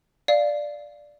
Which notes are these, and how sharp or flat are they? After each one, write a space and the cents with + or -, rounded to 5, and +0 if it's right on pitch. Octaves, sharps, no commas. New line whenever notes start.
D5 +0 F5 +0